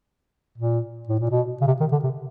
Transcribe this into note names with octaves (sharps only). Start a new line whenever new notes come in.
A#2
A2
A#2
B2
C#3
C3
D#3
D3
C3